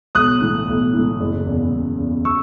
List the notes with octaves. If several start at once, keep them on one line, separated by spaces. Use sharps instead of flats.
B1 D#6 F#6
A2 E3
B1
A2 E3
F#1
E2 C#3
F#1
E2 C#3
C#6 E6